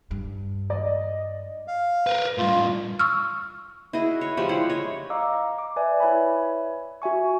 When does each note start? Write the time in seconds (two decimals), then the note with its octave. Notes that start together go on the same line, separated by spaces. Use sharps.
0.11 G2
0.70 D5 D#5
1.68 F5
2.07 A#4 B4
2.38 A2 G3 F4
2.99 C#6 E6 F6
3.93 E4 F#4 G#4 D#5
4.21 C#5
4.37 F3 G3 G#3 G4
4.49 E4 C5 F#5
4.70 C#5 D#5
5.10 D#5 F5 A#5 D6 E6
5.58 D6
5.76 B4 D5 E5 G#5
6.00 E4 B4 C#5 E5 G#5 B5
7.02 F#4 E5 G#5 C#6